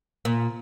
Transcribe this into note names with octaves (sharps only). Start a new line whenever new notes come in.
A#2